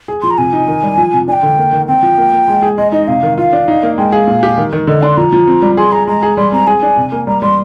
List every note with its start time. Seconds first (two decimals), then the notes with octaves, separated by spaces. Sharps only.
0.08 G#4
0.22 F3 C6
0.31 A#5
0.38 C3 G#5
0.53 D#4
0.68 D#3
0.83 G3
0.98 F3
1.13 C3
1.28 D4 G#5
1.32 G5
1.43 D3
1.58 A#3
1.73 D#3
1.88 C4 G5
2.03 F3
2.18 A#3
2.33 A#3
2.48 G#3
2.62 G#4
2.77 G#3 D#5
2.92 D#4 D#5
3.08 C3 F5
3.23 D#3
3.38 F4 F5
3.53 D4
3.68 D#4
3.83 A#3
3.98 G#3 G5
4.12 G#4 F5
4.27 A#2
4.43 G4
4.58 D#3
4.73 D#3
4.87 D3 D#5
5.03 D4 C6
5.17 F3 A#5
5.32 F3
5.47 C4
5.62 G3
5.77 G#4 C6
5.92 G#4 A#5
6.07 G#3 A#5
6.23 G#4
6.37 G3 C6
6.52 C4 A#5
6.67 G#4 G#5
6.82 D4
6.97 C3
7.12 A#3
7.27 G3 A#5
7.42 G3 C6